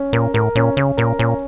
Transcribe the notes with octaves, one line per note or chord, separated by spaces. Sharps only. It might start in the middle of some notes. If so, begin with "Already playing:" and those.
Already playing: C#4
A#2 A#4
A2 A#4
A#2 C#4
C#3 C#4
A#2 A#4
A#2 C#4